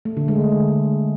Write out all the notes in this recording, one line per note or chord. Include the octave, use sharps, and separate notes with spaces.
A3
D3
G#3